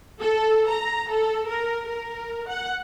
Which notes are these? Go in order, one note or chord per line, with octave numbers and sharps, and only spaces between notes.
A4
A#5
A4
A#4
A#4
F#5